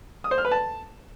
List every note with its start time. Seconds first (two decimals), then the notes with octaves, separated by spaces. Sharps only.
0.24 D#6
0.31 C5
0.38 F6
0.45 B4
0.51 A5